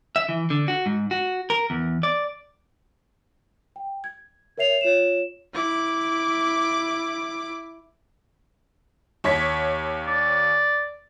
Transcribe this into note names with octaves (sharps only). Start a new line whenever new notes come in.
E5
E3
D3
F#4
G#2
F#4
A#4
E2
D5
G5
G#6
A#4 C#5 E5 C7 F7
F4 C#5 E7
E4 D6
D#2 C#5 B6
D5